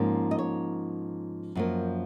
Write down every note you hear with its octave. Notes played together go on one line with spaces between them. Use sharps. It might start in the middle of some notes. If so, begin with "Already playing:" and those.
Already playing: G#2 F3 A#3 C#4
D#5
C#5
F#2 F3 A#3